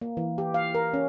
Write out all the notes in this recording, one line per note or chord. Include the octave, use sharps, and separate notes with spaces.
A#3
E3
G4
F5
A#4
C#4